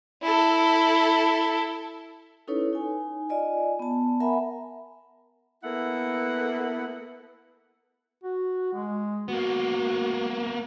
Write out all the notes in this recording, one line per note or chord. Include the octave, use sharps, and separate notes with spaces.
E4 A4
C#4 D#4 E4 A4 B4 C#5
D#4 G#5
F4 D5 D#5 G#5
B3 A5
A#4 E5 F#5 G#5 A#5 B5
A#3 B3 E4 A4 F#5
F#4
G#3
A#3 B3 F#4